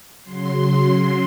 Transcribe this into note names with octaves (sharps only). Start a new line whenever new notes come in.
C#3 F#3 C6